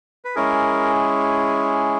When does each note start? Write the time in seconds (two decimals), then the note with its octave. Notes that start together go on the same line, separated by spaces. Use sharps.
0.25 B4
0.36 G#3 C#4 E4 G#4 A#4